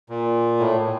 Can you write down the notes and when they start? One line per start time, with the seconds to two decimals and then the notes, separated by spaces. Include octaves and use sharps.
0.09 A#2
0.59 A2